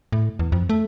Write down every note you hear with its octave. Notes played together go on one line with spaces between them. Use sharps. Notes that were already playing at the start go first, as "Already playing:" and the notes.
A2
E2
F2
A3